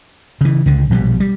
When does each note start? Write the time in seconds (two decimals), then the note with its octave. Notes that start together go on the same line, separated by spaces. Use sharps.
0.41 C#3 E3
0.66 C#2 D3
0.90 A#1 B2 D#3 G3
1.20 G3